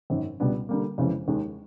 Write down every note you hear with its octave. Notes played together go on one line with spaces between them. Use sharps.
G#1 F#2 D#3
C#2 B2 G3 B3 D4
D3 G3 A#3
F2 C#3 E3 G#3
D#2 D#3 G#3